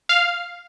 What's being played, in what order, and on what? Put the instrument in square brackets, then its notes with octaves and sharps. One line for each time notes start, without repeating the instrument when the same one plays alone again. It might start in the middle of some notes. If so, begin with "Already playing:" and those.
[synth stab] F5